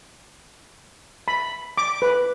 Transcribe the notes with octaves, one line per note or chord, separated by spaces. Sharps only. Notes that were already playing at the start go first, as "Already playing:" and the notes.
B5
D6
B4